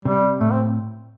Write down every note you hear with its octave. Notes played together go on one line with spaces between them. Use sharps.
C3 G3
A2 A3
C4